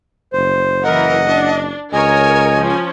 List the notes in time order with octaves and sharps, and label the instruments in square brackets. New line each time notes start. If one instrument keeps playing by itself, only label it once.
[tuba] F#1 [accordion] C5
[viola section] E3 A#4 [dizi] D#5 [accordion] F#5
[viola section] D4
[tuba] C#2 [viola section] A#4 C#5 [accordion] D#5 [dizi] G#5
[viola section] F3 C#4